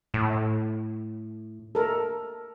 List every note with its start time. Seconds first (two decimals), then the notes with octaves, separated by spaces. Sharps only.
0.14 A2
1.75 A4 A#4